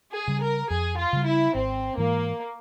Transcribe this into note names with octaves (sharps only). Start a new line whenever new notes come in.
G#4
C#3 G3
A#4
F2 G#4
F4
C#3 G3
E4
G#1 C4
G#2 E3 A#3